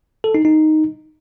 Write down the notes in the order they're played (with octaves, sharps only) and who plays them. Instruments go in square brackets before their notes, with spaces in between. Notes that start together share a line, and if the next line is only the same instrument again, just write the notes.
[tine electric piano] A4
D#4
D#4